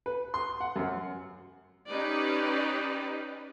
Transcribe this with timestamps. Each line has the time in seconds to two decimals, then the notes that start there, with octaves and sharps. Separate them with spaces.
0.06 B4
0.34 C6
0.60 F#5
0.76 F#2
1.89 C#4 D#4 G4 B4 D5